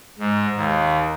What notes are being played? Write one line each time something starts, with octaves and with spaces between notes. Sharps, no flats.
G#2
D#2